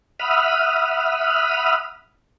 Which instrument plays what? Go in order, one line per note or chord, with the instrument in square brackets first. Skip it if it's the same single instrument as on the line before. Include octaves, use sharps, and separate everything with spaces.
[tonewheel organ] E5 F#5 B5 D#6 F6